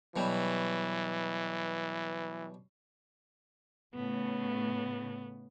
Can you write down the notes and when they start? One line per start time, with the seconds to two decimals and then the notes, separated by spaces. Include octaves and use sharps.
0.16 B2 E3 F#3 G3
3.95 A2 C#3 A3 B3